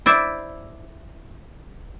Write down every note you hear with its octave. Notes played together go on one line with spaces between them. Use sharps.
E4 C5 D5 E5